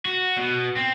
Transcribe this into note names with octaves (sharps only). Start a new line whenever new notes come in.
F#4
B2
C4